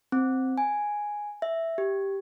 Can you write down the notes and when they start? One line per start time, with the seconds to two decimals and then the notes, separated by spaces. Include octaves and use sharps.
0.12 C4
0.58 G#5
1.42 E5
1.78 G4